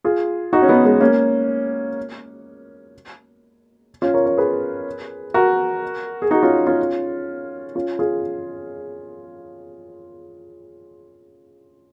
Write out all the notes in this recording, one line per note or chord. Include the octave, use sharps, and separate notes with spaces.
F4 G#4
D#4 F#4
C#4
B3 D#4
G#3 B3
A#3 C#4
C#4 F4
A#4 C#5
A#4 C#5
G#4 B4
F#4 A#4
G#4
D#4 F#4
C#4 F4
C#4 F4
C#4 F4
F4 G#4